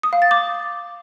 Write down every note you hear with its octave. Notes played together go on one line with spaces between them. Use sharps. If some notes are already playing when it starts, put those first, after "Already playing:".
D#6
F5
A6
D6